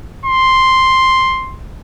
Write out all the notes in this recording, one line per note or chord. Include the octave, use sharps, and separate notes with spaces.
C6